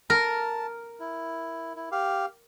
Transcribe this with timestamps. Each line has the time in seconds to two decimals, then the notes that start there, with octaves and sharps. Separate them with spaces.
0.10 A#4 A5
1.00 E4
1.76 E4
1.92 G4 F5